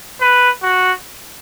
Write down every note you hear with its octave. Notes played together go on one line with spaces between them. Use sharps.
B4
F#4